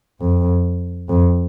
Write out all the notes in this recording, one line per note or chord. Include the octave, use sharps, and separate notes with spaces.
F2
F2